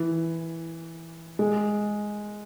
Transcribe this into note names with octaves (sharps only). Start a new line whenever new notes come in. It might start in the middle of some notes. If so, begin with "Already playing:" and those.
Already playing: E3
G#3